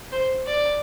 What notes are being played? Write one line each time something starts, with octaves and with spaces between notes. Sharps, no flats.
C5
D5